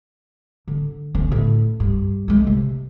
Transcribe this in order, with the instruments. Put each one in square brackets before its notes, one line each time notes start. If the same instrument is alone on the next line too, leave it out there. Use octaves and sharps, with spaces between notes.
[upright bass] D3
D3 C#4
A2
G2
G#3 A3
C3